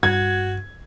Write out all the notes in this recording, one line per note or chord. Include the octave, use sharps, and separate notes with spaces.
G2 F#4 G#6